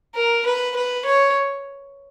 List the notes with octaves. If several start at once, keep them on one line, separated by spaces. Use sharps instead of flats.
A#4
B4
B4
C#5